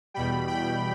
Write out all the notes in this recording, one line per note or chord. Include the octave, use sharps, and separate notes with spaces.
E2 B2 G3 G5 B5
G5 B5